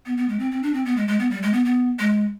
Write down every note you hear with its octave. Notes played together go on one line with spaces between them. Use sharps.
B3
B3
G#3
C4
C4
D4
C4
B3
G#3
G#3
B3
G3
G#3
B3
B3
G#3